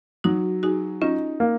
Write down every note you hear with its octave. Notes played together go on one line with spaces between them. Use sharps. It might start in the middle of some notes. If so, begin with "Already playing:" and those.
F#3 D#4 F#4
D#4 F#4 G#4
C#4 D#4 F4
A#3